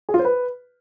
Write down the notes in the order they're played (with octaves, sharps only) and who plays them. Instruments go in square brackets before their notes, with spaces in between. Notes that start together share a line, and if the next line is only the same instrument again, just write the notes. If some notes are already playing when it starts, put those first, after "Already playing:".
[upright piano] G#4
F4
C5
B4